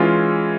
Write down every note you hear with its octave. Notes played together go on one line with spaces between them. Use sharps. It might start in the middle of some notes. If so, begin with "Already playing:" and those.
Already playing: E3 G#3 C#4 F4